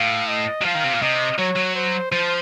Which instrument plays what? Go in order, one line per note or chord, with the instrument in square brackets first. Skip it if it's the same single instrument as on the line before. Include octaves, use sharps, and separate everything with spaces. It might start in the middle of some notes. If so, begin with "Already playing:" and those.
Already playing: [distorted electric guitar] A2 [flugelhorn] F5
[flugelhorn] D#5
[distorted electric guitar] F#3
[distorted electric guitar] F3 [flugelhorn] F5
[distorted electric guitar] D#3
C3
A#2
[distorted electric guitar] C3 [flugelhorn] D#5
[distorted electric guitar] F#3 [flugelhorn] C#5
[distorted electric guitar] F#3
[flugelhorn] C5
[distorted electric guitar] F3 [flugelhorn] C5